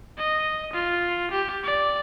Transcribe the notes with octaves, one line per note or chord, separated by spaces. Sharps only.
D#5
F4
G4
D5